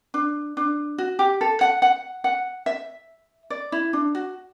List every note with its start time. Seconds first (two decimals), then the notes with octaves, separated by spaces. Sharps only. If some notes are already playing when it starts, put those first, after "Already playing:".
0.14 D4
0.57 D4
0.98 F#4
1.19 G4
1.41 A4
1.61 F#5
1.82 F#5
2.24 F#5
2.66 E5
3.50 D5
3.72 E4
3.93 D4
4.15 F#4